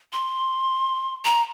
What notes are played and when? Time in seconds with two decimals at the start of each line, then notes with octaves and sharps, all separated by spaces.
0.13 C6
1.25 A#5